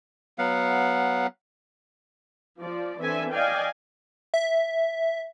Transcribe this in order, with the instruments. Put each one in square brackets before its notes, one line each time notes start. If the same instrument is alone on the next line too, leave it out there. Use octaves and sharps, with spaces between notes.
[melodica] F#3 B3 F5 F#5
[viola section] F3 D5
E3 C4 D4 A4 E5 G#5
D5 D#5 F5 G5 G#5
[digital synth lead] E5